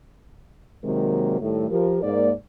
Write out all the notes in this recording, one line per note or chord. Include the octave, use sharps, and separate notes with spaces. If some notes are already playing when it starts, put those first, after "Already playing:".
C3 D#3 F#3 G#3 A#3 A#4
A2 D#3 G3 A3
F3 G4 A#4
G#2 A#3 D5